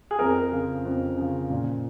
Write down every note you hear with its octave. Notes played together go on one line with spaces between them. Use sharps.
G#4
F2 A#4
C#3 F3
F2
C#3 F3
A#2